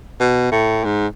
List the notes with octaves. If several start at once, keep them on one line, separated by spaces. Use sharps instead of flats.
B2
A2
G#2